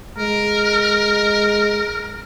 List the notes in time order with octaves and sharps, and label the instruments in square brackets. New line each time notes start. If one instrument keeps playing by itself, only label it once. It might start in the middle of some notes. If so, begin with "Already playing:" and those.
[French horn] G#3 [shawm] A#4